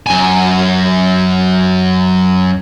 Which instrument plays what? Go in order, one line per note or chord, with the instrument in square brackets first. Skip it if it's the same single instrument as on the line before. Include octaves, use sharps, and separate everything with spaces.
[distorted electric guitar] F#2 G#5